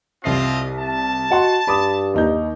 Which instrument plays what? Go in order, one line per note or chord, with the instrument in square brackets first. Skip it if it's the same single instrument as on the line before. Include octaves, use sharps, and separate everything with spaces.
[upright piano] C2 E5 C7 [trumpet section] C4 F4 D#5
[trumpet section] A5
[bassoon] F#4 [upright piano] D#5 F#5 C6
[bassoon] G2 [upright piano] B5 D6 D#6
[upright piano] D#2 D#4 G6